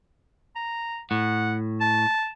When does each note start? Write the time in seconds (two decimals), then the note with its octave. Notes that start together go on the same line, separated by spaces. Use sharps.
0.56 A#5
1.11 A2 F#5
1.80 A5